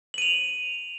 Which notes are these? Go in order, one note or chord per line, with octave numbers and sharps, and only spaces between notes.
D#7 F7 F#7